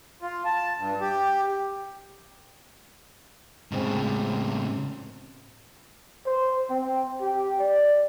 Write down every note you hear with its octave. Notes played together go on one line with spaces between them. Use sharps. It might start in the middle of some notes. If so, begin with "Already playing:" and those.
F4
A5
G2
G4
A2 C#3 G#3 C4 C#4
C5
C4
G4
D5